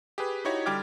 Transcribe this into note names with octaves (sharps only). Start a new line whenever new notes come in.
G4 G#4 B4
D#4 E4 F#4 G4 C#5
D3 G3 G5 D6 F6 G#6